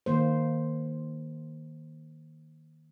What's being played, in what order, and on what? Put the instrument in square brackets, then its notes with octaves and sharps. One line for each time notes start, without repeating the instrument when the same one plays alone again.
[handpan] D#3 A#3 C5